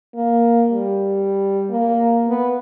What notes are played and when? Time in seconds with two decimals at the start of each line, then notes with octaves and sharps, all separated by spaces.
0.15 A#3
0.70 G3
1.70 A#3
2.28 B3